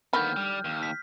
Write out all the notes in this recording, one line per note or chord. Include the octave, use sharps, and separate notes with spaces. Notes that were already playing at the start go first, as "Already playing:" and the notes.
D#2 D3 D#3 B3 B5 F6 G6
G3
D#2
B6